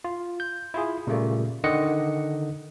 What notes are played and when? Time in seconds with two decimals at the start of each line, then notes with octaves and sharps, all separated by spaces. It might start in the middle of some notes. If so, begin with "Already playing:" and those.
0.04 F4
0.40 G6
0.74 E4 F4 G#4
1.07 A#2 C#3 G3 A3 A#3
1.64 D3 D#3 D#5 F#5 C#7